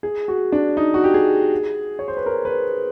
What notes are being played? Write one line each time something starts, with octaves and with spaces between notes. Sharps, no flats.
G#4
F#4
D4
D#4
F#4
G4
G#4
C#5
C5
B4
A#4
B4